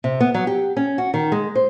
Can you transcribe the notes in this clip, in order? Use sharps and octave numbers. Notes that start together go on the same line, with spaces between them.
C3
B3
F#3
G4
C#4
F#4
D#3
G#3
C5